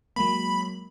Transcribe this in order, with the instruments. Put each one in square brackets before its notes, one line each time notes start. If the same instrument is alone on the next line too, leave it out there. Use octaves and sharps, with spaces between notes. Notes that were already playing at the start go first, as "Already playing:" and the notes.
[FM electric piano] F#3 G#3 A#3 [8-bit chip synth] B5